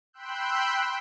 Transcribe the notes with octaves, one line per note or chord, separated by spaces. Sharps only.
G5 B5 C6 E6 F#6 G6